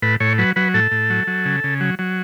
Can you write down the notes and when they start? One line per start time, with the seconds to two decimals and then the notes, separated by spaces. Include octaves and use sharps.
0.02 A2 B4
0.20 A2 C#5
0.38 F#3 B4
0.56 F#3 B4
0.74 A2 A4
0.91 A2
1.10 F#3
1.27 F#3
1.45 C#3
1.64 C#3
1.81 F#3
1.99 F#3